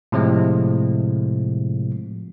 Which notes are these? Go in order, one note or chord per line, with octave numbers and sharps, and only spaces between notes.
A2 C3 F3 G#3